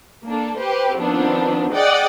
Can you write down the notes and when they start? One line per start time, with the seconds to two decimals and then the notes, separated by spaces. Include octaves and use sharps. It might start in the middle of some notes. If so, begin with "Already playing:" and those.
0.24 A#3 D4 A4
0.58 G4 B4 C5
0.96 D#3 F3 B3 C4 D4
1.72 G#4 D5 D#5 F#5 G5 D#6